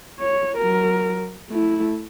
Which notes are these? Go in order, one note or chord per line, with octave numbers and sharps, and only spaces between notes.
C#5
F#3 A#4
A3 E4